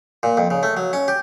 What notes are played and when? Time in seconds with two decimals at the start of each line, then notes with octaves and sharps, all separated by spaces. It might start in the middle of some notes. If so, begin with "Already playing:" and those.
0.23 A#2
0.37 F2
0.51 C#3
0.63 A3
0.77 F#3
0.93 C#4
1.08 G4